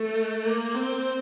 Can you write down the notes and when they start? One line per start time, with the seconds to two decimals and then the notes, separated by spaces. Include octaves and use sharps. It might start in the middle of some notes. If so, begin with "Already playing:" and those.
Already playing: A3
0.45 A#3
0.75 C4